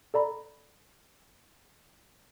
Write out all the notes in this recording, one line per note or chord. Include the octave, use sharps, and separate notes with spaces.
A4 D5 A#5 B5